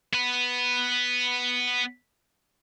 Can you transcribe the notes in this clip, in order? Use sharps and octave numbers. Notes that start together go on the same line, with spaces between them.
B3 B4